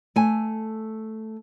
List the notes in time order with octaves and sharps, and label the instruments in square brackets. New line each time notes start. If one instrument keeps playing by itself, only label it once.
[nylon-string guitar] A3 G#5